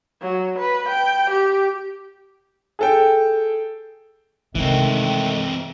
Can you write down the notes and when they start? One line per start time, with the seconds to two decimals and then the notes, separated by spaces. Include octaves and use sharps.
0.22 F#3
0.58 B4
0.89 G5
1.30 G4
2.79 G#4 A4 G5
4.55 C3 D#3 E3 G#3 A3 C4